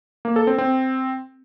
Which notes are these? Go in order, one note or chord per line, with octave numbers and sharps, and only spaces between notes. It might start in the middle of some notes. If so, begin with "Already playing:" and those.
A#3
A4
C4
C4